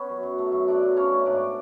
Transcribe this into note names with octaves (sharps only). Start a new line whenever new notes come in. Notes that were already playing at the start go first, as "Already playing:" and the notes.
Already playing: B3 C#4 C#5
F#2
F#2
A3
F#2
A3 D4 D5
F#3
C#3 C#4 C#5
A3
G#2 D4 D5